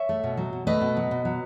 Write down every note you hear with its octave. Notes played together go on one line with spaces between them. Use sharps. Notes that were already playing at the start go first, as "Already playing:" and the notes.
Already playing: C#5 E5
A3
B2
F#3
B2
A3 B4 D#5
B2
F#3
B2
F#3